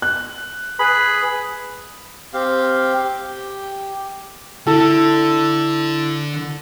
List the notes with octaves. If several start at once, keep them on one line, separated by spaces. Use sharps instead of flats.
F#6
G#4 B4 B5
C4 G4 F5
G4
D3 E4 A4